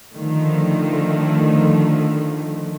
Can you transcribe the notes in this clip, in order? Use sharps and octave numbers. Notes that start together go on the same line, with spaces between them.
D3 D#3 F3 A3